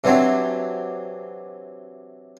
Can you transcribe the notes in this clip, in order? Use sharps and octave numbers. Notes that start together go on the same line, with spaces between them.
C3 E3 F#3 C4 D4